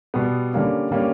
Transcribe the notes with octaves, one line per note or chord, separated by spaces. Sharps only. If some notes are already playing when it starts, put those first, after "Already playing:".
B2 G3 B3
D3 G3 A#3 C#4
D3 G3 A#3 C#4